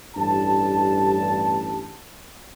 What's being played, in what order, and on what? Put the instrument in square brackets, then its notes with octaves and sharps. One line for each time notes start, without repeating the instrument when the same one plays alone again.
[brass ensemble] A1 G2 A5